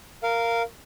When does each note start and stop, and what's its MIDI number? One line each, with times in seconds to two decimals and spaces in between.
0.23 0.62 70
0.23 0.62 77